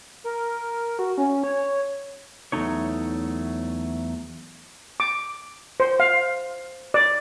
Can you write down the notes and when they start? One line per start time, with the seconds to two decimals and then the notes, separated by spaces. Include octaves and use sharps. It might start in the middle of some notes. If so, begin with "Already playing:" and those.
0.24 A#4
0.99 F#4
1.18 C#4
1.44 C#5
2.52 E2 G#2 F#3 A3 D#4 C#5
5.00 D6
5.80 C5
6.00 F5
6.94 D5